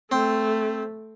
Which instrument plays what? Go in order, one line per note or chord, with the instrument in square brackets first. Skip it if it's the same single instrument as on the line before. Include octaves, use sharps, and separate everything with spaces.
[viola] A3 [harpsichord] C4